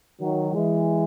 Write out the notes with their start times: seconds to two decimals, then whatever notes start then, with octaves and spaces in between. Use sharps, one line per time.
0.20 D#3 F#3
0.53 E3 G#3